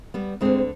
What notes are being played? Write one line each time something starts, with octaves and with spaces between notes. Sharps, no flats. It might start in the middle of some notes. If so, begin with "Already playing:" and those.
G3 B3
D2 D3 G#3 C4